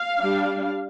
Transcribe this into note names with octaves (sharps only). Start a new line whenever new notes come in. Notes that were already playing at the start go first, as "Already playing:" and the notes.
Already playing: F5
G3 D4